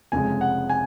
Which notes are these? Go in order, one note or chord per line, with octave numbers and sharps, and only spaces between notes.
F1 F2 C#3 G#3 G#5
F#5
G#5